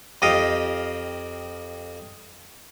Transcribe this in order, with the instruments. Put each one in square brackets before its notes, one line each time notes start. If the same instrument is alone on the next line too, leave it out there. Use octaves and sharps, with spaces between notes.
[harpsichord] F2 G4 D#5 F5